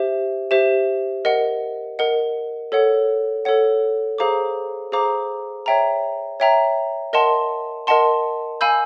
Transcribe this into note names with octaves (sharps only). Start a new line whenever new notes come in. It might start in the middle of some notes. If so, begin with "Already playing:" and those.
Already playing: G4 C5 E5
G4 C5 E5
A#4 D#5 F#5
A#4 D#5 F#5
A4 C#5 F#5
A4 C#5 F#5
G#4 C5 F5 A#5 D6
G#4 C5 F5 A#5 D6
C#5 E5 G5 A#5
C#5 E5 G5 A#5
A#4 D#5 F#5 A5 C6
A#4 D#5 F#5 A5 C6
F5 G#5 B5 E6 G6